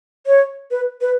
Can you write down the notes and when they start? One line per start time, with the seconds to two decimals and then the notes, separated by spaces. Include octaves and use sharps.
0.27 C#5
0.71 B4
1.01 B4